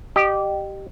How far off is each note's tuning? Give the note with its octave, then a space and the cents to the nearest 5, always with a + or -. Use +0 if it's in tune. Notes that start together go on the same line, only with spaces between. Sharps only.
G4 -10 D#5 -35